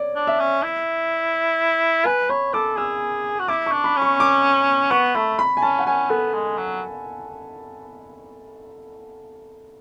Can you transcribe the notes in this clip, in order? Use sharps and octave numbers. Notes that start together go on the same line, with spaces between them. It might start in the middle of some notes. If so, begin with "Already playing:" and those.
Already playing: C#5 D5
D4
E5
C#4
E4
B4 G#5
C#5 B5
A4 D6
G#4 E6
F#4
E4 D6
C#6
D4
B5
C#4
C#6
D6
B3 C#6
A3 B5
B5
G#5
C#4 A5
F#5
C#4 G#5
B3 A4
G#3
F#3